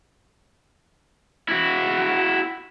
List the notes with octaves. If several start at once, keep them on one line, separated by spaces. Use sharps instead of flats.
E4 F#4